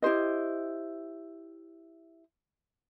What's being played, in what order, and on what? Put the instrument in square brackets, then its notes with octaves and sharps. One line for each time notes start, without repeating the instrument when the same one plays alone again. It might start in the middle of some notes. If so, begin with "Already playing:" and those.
[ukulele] E4 G4 C5 D#5